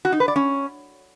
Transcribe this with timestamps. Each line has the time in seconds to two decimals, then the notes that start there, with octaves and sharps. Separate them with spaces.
0.05 F#4
0.12 D#4
0.20 B4
0.28 D5
0.36 C#4